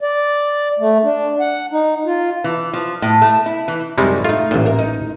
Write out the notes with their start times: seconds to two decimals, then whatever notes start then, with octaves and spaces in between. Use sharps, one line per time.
0.01 D5
0.79 A3
1.04 D4
1.40 F#5
1.72 D#4
2.06 F4
2.44 E3
2.73 F3
3.02 A2
3.22 A3
3.46 E4
3.68 E3
3.98 F#2 C3 G3 G#3 D#4
4.24 A3 D#4 F4
4.51 A1 A#2
4.66 A#4
4.79 D#4